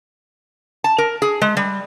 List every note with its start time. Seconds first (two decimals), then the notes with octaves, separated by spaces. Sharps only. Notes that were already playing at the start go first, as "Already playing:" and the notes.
0.84 A5
0.98 A#4
1.22 G#4
1.42 G#3
1.57 G3